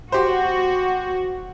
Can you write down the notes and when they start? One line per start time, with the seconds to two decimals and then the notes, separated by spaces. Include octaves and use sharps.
0.12 F#4 G4 C5